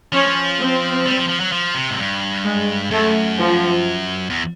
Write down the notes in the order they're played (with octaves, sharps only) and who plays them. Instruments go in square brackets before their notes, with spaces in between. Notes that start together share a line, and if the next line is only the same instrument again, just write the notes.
[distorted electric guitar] F3 [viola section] C#4
[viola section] C4
[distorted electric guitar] G3
F3
F3
F#3
F3
C3
G#2
G2
[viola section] G#3
[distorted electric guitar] F#2 [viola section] A3
[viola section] F3
[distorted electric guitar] E2